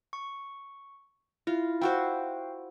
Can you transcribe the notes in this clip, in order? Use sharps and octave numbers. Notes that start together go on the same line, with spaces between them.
C#6
E4 F4
E4 F#4 C5 F5 G5